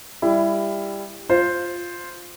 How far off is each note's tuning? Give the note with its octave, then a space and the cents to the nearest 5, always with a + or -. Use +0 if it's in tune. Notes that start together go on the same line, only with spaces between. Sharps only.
G3 +20 E4 +20
F4 +0 C5 +0